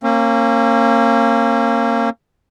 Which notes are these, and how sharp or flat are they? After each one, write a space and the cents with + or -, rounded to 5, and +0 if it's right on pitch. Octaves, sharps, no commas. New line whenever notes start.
A#3 -20 C#4 -40